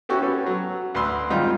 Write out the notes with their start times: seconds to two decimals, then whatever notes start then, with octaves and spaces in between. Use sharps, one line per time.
0.09 B3 C#4 E4 F#4 G4 A4
0.22 B3 C#4 A4
0.46 F#3
0.95 D2 B4 C6 E6
1.30 D#3 G3 G#3 C4 D#4 F4